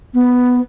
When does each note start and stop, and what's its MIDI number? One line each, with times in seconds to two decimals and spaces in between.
0.14 0.60 59